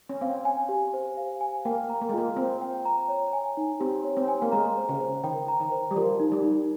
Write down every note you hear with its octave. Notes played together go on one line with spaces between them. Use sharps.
C#4
C4 F5
G#5
G4
C5
F5
G#5
A#3 G5
A#5
A#3
G#3
A#3 F4
C4 C5
G5
A#5
C#5
G#5
D#4
C4 G4
C#5
C4
G#5
A#3
G#3 A#5
C5
C#3
C5
D#3 G5
A#5
D#3
C5
G3
F3 A#4
D#4
G3
D#4